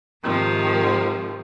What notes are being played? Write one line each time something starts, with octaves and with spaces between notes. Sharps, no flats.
G#2 C3 D#3 F3